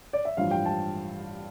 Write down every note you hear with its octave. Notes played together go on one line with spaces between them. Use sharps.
D5
E5
A1 G2 F3 F5
G5
A5